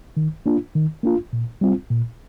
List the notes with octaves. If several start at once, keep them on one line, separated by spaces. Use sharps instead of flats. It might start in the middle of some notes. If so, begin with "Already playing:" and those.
D#3
A#3 D4 F4
D#3
A#3 D4 F4
A#2
G3 C4 F4
A#2